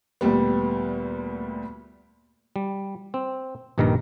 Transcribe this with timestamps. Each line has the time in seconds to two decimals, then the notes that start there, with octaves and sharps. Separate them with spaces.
0.21 D2 A#2 G3 B3
2.56 G3
3.14 C4
3.78 A#1 G2 D#3 G3 A#4 A#5